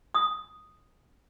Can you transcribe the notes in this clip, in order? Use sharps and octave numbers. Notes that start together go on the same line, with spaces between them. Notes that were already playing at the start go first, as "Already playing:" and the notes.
D#6